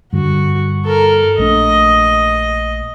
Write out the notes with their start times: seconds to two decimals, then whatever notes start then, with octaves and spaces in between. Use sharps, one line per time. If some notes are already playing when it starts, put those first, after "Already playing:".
0.13 G2 D3 F#4
0.84 A4 A#4
1.38 A#1 A3 D4 D#5